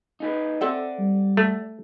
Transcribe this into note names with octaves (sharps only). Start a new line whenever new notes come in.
D#4 G#4 B4
C4 A4 D5 E5 F#5
G3
A3